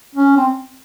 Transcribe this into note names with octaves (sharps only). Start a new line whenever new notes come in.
C#4
C4